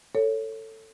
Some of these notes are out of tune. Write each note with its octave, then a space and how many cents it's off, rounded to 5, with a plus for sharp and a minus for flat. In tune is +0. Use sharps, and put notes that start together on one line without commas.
A4 +15 C#5 +0